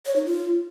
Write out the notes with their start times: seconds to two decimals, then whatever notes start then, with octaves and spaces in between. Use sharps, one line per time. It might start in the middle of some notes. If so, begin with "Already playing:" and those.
0.06 C#5
0.16 D#4
0.26 F4